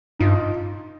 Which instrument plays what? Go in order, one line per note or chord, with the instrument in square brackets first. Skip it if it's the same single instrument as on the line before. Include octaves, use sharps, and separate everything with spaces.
[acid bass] G2 [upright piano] D#4 F4